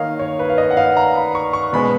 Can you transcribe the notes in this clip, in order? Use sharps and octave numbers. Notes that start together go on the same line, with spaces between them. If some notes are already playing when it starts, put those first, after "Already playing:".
Already playing: D#3 A#3 C#5 D#5 F5
C#5
B4
F5
D#5
F#5
F5
A#5
B5
C#6
C#6
B2 G#3 B3 B5